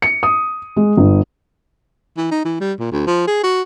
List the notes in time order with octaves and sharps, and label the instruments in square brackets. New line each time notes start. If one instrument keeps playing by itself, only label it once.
[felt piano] C#7
D#6
G#3
G1
[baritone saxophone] E3
D#4
E3
G3
A#2
D2
F3
G#4
F#4